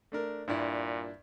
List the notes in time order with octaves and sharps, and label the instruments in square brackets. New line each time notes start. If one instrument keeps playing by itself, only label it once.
[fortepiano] A3 D4 A#4
[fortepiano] G2 D4 E4 [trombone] A#2